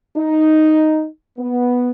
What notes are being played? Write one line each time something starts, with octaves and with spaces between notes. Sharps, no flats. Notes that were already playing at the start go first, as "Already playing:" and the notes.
D#4
B3